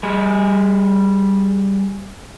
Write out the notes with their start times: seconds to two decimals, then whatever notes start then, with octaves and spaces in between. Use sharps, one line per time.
0.03 G3 G#4